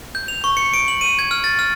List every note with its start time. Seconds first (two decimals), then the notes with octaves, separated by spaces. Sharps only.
0.15 G6
0.28 F7
0.44 C#6
0.57 C#7
0.74 D7
0.88 F#7
1.01 D#7
1.19 G#6
1.31 F6
1.44 A6
1.59 F6